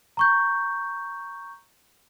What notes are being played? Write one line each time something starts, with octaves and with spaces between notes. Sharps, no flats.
A#5 C#6 G6